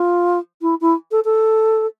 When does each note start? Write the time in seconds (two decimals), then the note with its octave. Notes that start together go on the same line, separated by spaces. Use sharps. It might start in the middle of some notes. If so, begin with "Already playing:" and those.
Already playing: F4
0.61 E4
0.81 E4
1.11 A4
1.24 A4